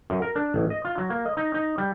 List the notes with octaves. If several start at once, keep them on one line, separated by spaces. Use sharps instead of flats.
F#2
A#4
D4
A1
D#5
F4
F#3
A#3
D#5
D#4
D#4
G3